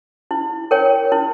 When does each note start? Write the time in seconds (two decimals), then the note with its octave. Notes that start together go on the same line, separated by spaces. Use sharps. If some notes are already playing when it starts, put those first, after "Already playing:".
0.31 E4
0.71 A#4 C#5 G5
1.12 E4